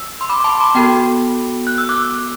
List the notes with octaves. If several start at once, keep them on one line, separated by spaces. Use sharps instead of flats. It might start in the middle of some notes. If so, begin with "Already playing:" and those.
Already playing: E6
C6
B5 D6
D6
A5 C6
B5 D6
B3 F#4 A4 G5 B5
F#6
E6
D6 F#6